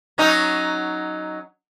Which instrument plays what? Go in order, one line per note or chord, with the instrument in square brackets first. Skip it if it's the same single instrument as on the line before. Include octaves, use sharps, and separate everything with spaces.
[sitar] F#3 C#4 D#4